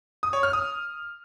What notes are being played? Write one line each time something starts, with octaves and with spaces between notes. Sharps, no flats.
D#6
C#5
F6
D#6